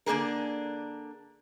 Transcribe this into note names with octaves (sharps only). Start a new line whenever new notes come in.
D3 A#3 D4 G#4 A#4